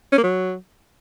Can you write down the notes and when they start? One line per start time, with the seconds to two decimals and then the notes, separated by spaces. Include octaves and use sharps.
0.12 C#4
0.18 A#3
0.24 F#3